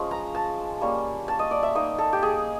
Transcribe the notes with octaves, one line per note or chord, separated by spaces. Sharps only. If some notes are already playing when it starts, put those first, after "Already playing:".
Already playing: F3 G#3 C#4 F4
A#5
A5
G3 A#3 C#4
A5
D#5
D5
E5
A#3 D#4 D#5
A4
G4
G#4